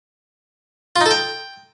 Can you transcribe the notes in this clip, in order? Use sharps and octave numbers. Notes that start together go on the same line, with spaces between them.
F4
D#4
A4
G5